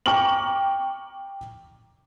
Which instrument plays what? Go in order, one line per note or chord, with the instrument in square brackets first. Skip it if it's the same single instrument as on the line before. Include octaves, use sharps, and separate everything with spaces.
[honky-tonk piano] G5 A#5 C#6 D6 F6 F#7